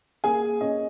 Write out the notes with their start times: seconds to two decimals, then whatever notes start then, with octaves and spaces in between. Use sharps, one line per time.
0.24 A#3 G#4 G#5
0.61 C#4 D#5